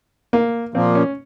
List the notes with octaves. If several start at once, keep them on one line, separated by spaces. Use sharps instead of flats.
A#3
A#2 F3 A#3 C4
C#4